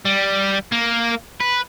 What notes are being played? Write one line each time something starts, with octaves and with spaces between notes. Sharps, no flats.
G3
A#3
B4